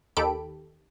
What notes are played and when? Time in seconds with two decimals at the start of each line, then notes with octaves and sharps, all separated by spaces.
0.17 D#2 D#3 G4 A4 B5 D7